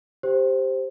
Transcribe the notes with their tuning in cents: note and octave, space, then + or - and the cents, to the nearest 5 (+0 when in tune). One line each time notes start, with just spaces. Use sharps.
G4 +0 C5 +0